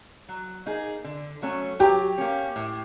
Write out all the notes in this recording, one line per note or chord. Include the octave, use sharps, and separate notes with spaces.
F#3
A#3 D#4 G#4
D3
F#3 A3 C#4
F#3 G4
A#3 C#4
A2